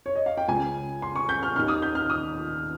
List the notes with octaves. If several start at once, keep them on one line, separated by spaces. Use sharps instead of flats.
C#5
D#5
F5
G5
C#2 C#3 G#5
C6
C#6
G6
F6
D#2 D#3 F6
D#6
G6
F6
D#6